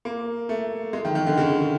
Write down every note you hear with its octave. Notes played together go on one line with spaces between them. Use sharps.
A#3
A3
G#3
D#3
D#3
D3
C#3